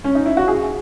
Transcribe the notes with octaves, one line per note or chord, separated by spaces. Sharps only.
C#4
D#4
E4
F#4
G#4